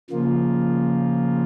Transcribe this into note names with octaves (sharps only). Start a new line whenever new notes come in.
C#3 F3 A#3 F4